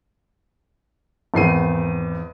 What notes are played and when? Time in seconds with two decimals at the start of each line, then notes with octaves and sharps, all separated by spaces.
1.34 G#1 E2 C7 D#7